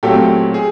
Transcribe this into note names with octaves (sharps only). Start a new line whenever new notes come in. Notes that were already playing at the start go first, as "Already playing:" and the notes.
A#2 F#3 A3 C4 G4 A4
G#4